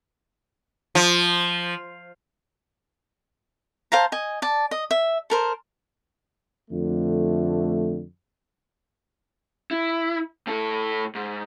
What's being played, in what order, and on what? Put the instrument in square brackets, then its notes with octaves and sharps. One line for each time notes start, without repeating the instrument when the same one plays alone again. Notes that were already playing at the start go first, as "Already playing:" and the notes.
[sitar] F3
[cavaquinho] C5 F5 A5 A#5
D#5 G#5
D5 A5
D#5
E5
A4 A#4 C5
[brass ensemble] F2 D3 A3
[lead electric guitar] E4
A2 A4
G#2